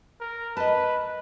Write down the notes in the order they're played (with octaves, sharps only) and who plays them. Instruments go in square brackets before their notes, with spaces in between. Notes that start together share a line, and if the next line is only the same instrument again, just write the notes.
[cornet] A#4
[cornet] B4 [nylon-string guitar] D#5 A5